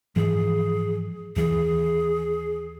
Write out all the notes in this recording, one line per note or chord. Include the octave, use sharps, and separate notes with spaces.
G#2 E3 F3 G#4
D#2 E3 G#4